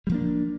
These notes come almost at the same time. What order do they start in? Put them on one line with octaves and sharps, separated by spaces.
G3 F3 A#3 D4